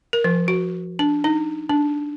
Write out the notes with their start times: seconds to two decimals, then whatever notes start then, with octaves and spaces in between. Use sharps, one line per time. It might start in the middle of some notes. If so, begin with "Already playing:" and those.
0.13 A#4
0.24 F3
0.48 F#4
0.99 D4
1.24 D#4
1.69 D4